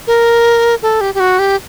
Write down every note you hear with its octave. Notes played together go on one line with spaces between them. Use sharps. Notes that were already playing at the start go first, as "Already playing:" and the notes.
A#4
A4
G4
G4
F#4
G4